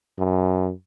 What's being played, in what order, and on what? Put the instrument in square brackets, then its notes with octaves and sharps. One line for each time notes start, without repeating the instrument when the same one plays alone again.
[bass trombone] F#2